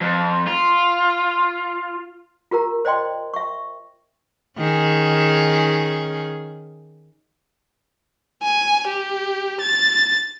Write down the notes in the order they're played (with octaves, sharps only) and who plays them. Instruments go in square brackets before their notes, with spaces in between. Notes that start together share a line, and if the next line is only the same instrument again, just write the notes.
[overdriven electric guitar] F2
F4
[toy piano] F4 G4 A#4 A#5
C5 D5 D#5 G5 C6
E5 C#6
[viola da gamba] D#3 C#4 G#4
[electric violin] G#5
G4
A6